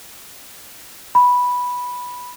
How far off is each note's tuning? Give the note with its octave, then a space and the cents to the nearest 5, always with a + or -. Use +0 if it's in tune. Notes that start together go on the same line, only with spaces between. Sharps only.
B5 -5